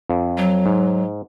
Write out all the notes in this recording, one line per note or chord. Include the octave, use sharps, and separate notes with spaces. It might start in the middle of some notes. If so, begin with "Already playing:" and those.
F2
F#3
G#2